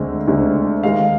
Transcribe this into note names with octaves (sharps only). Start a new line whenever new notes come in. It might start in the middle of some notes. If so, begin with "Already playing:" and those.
Already playing: D2 D3 G#3 C4
D2 D3 G#3 C4
D#2 D#3 G#3 F5